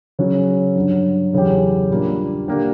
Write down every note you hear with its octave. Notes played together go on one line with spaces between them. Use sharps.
C#3 F#3 C#4 F#4
G2 D3 F#3
E2 C#3 F#3 C#4 G4
A#2 G3 A#3 D4
D3 A#3 D4 G4